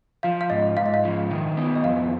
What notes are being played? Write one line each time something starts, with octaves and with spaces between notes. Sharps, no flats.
F3 F5
F5
G#2 D#5
G#2 F5
D#5
F5
F3
D#3
B3
D#5
F2 F5